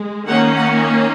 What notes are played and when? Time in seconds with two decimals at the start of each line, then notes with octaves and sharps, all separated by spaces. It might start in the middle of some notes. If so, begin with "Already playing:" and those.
Already playing: G#3
0.27 D#3 A#3 C#4 F#5
0.56 F#5